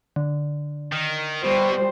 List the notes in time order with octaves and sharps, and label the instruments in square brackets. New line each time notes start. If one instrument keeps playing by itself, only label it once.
[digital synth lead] D3
[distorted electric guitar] D#3
[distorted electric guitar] B2 [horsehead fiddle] G3 C5